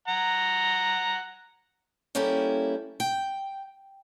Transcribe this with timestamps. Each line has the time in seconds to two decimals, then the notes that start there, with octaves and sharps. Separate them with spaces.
0.08 F#5 A#5
2.15 G3 A#3 C#4 E4 G4 A4
3.00 G5